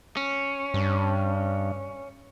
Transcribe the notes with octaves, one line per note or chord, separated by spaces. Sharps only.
C#4
G2